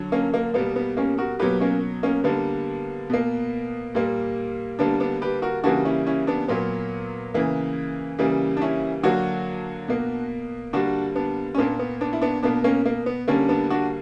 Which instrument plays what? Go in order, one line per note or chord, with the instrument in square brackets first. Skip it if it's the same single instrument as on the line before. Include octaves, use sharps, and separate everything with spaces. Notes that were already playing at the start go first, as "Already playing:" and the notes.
Already playing: [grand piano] D3 F#3
A#3 C#4
A#3
B2 G3 A#3 B3
B3
A#3 C#4
F#4 A#4
B2 F#3 A#3 G4 B4
A#3 C#4
A#3 C#4
D3 G3 A#3 B3
B2 A#3
A#2 G3 A#3
D3 G3 A#3 B3 D4
B3 D4
G4 B4
F#4 A#4
C#3 E3 G3 A#3 D4 F#4
C#4 E4
C#4 E4
B3 D4
A#2 F#3 A#3 B3
C#3 E3 A#3
C#3 E3 G3 A#3
D4
C#4 E4
D3 F#3 A#3 D4 F#4
B2 A#3
D3 G3 A#3 D4 F#4
B3 D4
C#4
A#2 A#3 B3 D4
B3
B3 D4
E4
B3 D4
B2 A#3 B3 D4
A#3 C#4
A#3
B3
D3 G3 A#3 C#4
B3 D4
D4 F#4